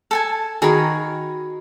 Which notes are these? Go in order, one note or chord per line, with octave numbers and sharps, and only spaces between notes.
A4 G#5 A5
D#3 F#4 G#4 A#4 B5